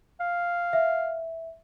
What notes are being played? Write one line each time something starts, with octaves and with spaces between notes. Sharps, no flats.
F5
E5